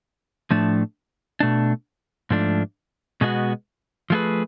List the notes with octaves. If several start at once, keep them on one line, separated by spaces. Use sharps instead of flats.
A2 F3 A3 D4
B2 A3 D4
G#2 F3 A3 D4
B2 G#3 B3 D4 F#4
F3 A3 F4 G#4 B4